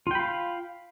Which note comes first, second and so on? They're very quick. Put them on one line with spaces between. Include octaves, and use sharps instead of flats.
F4 G5 B5 F5